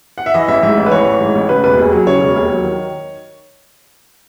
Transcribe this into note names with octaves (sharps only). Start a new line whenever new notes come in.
F#5
E5
E3 D#5
A1 E5
G#2 E5
A1
B4
E3 C#5
A1
G#2
A1
C#3 B4
E1 B4
D#2 G#4
F#3
C#3 C#5
E1
D#2
F#3
D#3